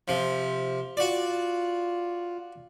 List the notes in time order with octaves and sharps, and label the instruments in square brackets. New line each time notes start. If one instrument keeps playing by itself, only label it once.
[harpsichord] C3 F3
[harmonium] F4 [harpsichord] F#4 D5